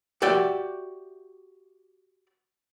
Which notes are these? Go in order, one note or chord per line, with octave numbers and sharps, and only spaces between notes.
F#4 G4 D5 E5 G5